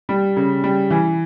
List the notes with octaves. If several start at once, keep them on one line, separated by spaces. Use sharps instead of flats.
G3
C#3
G3
E3